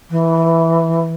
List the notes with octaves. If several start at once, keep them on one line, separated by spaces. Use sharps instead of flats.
E3